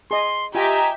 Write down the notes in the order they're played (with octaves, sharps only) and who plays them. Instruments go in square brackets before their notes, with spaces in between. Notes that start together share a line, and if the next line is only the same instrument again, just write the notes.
[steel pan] G#4 D#5 [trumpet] C6
[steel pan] F4 G5 [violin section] G4 E5 [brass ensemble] D#5 A#5 [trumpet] G#5